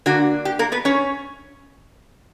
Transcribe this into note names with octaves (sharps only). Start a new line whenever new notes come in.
D3 A#3 D4 F#4
G4
A#3 A#4
B3 B4
C#4 C#5